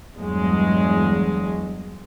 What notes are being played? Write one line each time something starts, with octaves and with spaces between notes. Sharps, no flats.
E2 G2 F#3 G#3